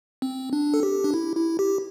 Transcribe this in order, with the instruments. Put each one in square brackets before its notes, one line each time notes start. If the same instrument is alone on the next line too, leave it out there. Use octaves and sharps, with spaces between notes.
[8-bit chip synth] C4
D4
A4
G4
D4
E4
E4
G4